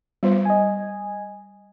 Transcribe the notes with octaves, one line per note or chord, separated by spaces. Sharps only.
G3 B3 F4 C5
D#5 G#5